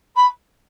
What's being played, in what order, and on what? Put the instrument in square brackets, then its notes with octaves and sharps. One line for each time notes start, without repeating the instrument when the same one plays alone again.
[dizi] B5